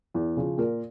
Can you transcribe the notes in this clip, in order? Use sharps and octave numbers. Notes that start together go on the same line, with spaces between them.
E2
C#3 F3
A#2 A#4